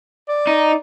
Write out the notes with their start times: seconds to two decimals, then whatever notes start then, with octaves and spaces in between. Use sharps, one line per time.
0.28 D5
0.47 D#4